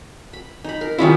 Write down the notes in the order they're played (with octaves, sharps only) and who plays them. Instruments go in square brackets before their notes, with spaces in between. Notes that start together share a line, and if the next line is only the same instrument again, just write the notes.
[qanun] B5
D#4 B5
A#4
[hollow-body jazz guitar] D#3 C#4 E4 [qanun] F4 G4